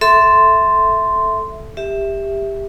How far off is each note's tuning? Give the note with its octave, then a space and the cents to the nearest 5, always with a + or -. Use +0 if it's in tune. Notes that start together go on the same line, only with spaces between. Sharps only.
A4 +0 E5 +0 C6 -5
G4 +20 E5 +0